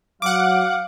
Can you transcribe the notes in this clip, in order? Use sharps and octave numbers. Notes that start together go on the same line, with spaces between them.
F#3 F5 F#5 D6